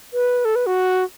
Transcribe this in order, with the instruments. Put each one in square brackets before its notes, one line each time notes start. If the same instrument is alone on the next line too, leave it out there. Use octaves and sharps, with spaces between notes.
[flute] B4
A4
B4
F#4